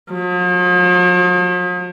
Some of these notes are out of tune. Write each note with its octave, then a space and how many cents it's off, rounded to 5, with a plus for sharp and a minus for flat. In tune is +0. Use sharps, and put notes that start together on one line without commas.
F3 +45